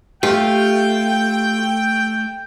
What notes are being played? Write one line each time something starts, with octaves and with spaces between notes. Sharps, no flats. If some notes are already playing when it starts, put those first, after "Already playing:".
A3 F4 G4 G5